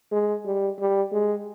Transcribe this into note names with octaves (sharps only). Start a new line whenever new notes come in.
G#3
G3
G3
G#3